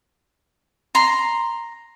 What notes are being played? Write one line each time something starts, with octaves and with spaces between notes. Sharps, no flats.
A#5 C6